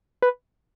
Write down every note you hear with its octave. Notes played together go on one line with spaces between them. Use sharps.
B4